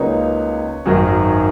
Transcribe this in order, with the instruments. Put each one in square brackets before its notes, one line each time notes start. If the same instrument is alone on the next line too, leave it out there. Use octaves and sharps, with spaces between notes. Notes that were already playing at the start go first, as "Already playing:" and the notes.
Already playing: [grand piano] C#2 C#3 F#3 A#3 D#4 [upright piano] B4 C#5
[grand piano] G#1 F#2 D#3 F#3